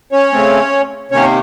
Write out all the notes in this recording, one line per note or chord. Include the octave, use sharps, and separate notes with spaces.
C#4 C#5
C#3 A3 C4
C3 D#3 A#3 C#4 C#5